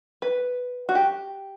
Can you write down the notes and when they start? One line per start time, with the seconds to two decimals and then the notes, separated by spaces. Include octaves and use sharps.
0.22 B4
0.89 F#4
0.95 G4